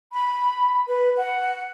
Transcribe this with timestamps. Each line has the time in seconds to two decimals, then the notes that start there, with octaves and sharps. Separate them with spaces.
0.12 B5
0.86 B4
1.17 F#5